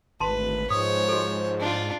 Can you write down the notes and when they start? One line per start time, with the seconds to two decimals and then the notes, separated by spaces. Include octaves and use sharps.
0.20 G#1 D2 B4 A5 C6
0.70 G#2 F3 G#3 C5 C#5 D#6
1.08 F#4 A4
1.60 D4 F4